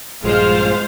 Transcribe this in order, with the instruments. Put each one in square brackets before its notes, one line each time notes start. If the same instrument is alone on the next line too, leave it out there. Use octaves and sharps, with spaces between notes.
[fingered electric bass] A#1 G2 [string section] F3 G#3 [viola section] F4 C5 F5